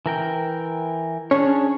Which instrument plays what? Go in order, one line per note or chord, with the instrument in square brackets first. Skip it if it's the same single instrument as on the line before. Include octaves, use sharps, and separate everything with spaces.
[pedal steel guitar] E3 A#4 G5
[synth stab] C#4 [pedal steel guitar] D4 G#4 C#5